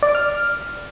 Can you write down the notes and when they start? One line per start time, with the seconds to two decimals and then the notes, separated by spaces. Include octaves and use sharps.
0.03 D5
0.09 D6
0.15 F6